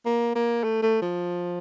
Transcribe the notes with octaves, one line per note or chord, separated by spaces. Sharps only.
A#3
A#3
A3
A3
F3